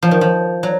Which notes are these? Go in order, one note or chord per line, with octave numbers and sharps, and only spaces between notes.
F3
D#3
F3
F#3